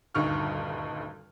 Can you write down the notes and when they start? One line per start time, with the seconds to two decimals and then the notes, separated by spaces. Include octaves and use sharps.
0.15 D#1 D2 G2 D#4 C#6 F6